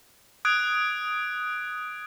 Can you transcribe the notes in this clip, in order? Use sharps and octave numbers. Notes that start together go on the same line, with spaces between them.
D#6 F#6 G#6 D7